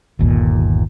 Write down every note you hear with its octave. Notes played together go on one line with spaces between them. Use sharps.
G1 D#2 A#2